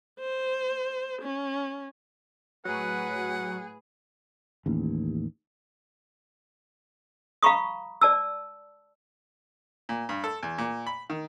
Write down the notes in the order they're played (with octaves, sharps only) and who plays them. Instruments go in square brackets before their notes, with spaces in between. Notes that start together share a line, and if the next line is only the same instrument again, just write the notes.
[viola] C5
C#4
[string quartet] A2 G#4 [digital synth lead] F#3 [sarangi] B4 [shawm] F#5
[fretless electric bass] A1 D#2
[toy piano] F5 A#5 B5 C#6 D#6
D5 A5 E6
[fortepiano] A#2
G2
A4
E2
A#2
B5
D#3